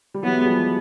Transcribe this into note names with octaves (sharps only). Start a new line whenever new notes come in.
G3
E3 F#3 B3
G#3
F3 G3